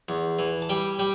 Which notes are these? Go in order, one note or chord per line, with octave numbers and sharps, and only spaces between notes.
E2
E3
A5
G3 G5
G3 G5